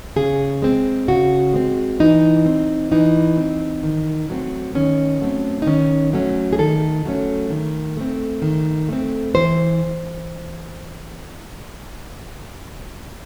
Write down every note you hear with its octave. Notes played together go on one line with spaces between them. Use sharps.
C#3 G#4
G#3 C4
C#3 F#4
G#3 C4
E3 D#4
C4
E3 D#4
C4
D#3
F#3 A3 C4
D#3 C#4
F#3 A3 C4
D#4
D#3 C#4
F#3 A3 C#4
G#4
D#3 A4
F#3 A3 C#4
D#3
A3 C4
D#3
A3 C4
E3 C5